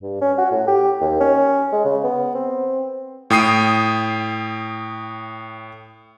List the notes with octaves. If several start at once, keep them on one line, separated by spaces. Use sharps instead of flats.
G2
C#4
F#4
A2
G4
D#2
C#4
G#3
C#3
B3
C4
A2 G5 D#6 C7 D#7